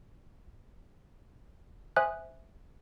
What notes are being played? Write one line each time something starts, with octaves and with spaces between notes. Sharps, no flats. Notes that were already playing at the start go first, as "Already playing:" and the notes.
C5 E5 G#5 D#6 F#6